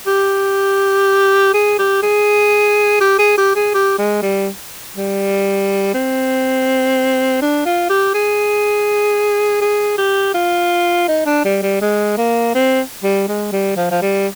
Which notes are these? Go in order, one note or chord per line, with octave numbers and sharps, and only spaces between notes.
G4
G#4
G4
G#4
G4
G#4
G4
G#4
G4
G#3
G3
G3
C4
D4
F4
G4
G#4
G#4
G4
F4
D#4
D4
G3
G3
G#3
A#3
C4
G3
G#3
G3
F3
F3
G3